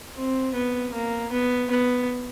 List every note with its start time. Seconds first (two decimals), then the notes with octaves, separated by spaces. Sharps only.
0.16 C4
0.54 B3
0.94 A#3
1.32 B3
1.70 B3